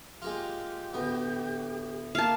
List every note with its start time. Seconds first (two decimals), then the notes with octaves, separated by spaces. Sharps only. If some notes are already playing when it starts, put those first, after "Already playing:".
0.22 G#3 A#3 F4 G4
0.94 D2 A2 B3
2.15 A#3 F5 A5